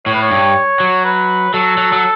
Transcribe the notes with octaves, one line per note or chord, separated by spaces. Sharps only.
A2 C#5
B4
C#5
G2
F#3
B4
F#3 A4
F#3
F#3